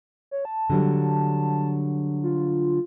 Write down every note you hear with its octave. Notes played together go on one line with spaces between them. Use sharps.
C#5
A5
D3 F#3 G3
F4